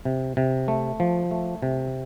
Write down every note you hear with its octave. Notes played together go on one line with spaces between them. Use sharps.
C3
C3
A3
F3
A3
C3